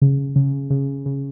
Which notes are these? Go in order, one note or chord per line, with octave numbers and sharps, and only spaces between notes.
C#3
C#3
C#3
C#3